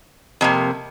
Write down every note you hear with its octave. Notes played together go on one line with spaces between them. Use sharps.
F2 C3 A#3